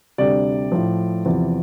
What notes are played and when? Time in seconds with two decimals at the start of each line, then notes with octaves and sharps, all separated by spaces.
0.18 D2 C3 G3 D5
0.72 A2 F3
1.25 E2 C3 F3